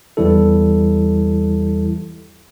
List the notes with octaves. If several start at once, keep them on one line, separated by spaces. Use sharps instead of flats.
E2 E3 G3 E4 A4